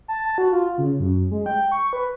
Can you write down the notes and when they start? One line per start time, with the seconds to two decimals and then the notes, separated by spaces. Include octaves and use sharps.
0.08 A5
0.38 F#4
0.53 F4
0.78 C#3
1.00 F#2
1.31 G#3
1.46 G5
1.72 C#6
1.93 B4